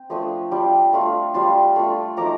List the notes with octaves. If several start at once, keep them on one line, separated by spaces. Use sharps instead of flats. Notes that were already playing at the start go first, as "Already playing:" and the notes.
Already playing: C4 G5
F3 A3 D4 F4 C6 D#6
G3 D4 F4
A3 D4 F4
G3 D4 F4 A5 C6
A3 D4 F4
F3 A3 D#4 A#5 D6